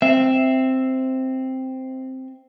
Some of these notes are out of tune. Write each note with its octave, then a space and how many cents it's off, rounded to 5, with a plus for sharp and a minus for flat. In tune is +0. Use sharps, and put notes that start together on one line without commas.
C4 +0 E5 +0